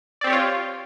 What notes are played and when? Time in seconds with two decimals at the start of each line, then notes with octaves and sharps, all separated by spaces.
0.21 D5
0.24 C4
0.27 G4
0.30 C#5
0.33 F4